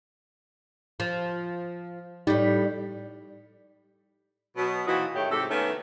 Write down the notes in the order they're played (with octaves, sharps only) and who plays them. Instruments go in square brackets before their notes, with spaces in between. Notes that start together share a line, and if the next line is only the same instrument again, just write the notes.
[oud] F3
[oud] A2 G3 [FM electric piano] D#4 G6 B6
[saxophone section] B2 F#3 B3
A#2 E3 F3 D#4 F#4
A2 D#3 A3 G4 G#4 C#5
G#2 C3 G4 A4
D#3 A3 B3 C#4